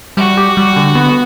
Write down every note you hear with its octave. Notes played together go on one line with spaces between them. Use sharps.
G3 F#4
G4
G3
D3
B3